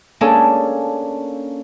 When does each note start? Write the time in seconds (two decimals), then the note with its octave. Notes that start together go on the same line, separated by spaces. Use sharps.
0.21 A#3 C#4 D4 G#4 A4